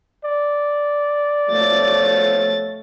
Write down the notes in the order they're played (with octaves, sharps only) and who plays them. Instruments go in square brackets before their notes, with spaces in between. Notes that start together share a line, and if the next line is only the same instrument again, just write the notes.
[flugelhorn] D5
[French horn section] B2 F3 C#5 [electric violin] A3 A6